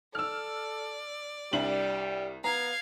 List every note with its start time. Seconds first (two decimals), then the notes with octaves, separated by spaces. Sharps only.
0.15 A4 D5 E6 F6
1.53 C2 G3 D4 F#7
2.44 B3 F5 A#5 G#6